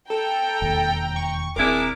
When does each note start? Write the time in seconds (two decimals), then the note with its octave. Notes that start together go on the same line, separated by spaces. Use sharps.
0.10 A4 G5 A#5
0.62 E1 D#2
1.16 C#6
1.56 D#1 G#3 C4 D4 E4 A#4 D6